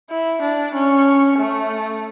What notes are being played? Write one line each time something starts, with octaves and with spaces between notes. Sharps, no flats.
E4
D4
C#4
A3